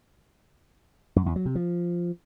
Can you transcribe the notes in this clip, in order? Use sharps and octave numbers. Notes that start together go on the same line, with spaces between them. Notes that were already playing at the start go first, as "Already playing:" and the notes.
F#2
E2
F#3
C3
F3